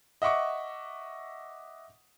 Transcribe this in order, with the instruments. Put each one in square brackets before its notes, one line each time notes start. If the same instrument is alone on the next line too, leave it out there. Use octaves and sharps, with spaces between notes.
[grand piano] D#5 E5 F#5 C#6 D6